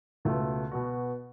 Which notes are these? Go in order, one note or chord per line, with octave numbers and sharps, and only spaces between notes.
C#2 B2 A3
B2 B3 F#4